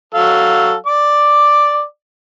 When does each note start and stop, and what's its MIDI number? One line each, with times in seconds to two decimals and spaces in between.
0.14 0.74 54
0.14 0.74 69
0.14 0.74 77
0.86 1.83 74
0.86 1.83 86